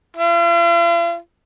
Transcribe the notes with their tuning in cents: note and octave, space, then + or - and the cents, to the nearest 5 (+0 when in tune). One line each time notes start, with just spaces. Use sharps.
F4 -45